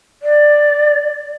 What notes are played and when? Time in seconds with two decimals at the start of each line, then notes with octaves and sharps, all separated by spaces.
0.23 D5